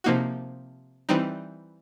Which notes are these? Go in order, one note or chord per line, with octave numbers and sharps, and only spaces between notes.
C3 F3 A#3 D#4 F#4
E3 G3 C4 D#4